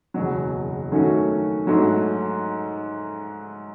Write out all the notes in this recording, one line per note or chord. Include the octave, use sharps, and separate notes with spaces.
F#1 E2 B2 F#3
D#3 F#3 A3 C#4 F#4
G#2 F#3 A3